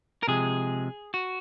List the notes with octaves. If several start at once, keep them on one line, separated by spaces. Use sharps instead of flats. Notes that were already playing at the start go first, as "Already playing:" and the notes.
A#4
C3 F3 G#3 G#4
F#4